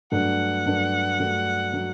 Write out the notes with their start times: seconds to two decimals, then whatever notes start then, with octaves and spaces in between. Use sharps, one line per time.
0.12 G2 F#3 A3 D4 F#5
0.66 G2 F#3 A3 D4
1.19 G2 F#3 A3 D4
1.72 F#3 A3 D4